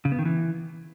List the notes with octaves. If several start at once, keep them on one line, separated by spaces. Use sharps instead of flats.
C#3
B3
D#3
E3